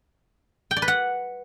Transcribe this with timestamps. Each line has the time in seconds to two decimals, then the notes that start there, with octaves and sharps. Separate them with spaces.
0.71 G5
0.76 D5
0.82 B4
0.88 F#5